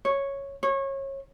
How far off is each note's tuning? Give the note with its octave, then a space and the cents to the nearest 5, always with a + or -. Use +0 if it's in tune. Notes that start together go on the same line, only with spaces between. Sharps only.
C#5 -5
C#5 -25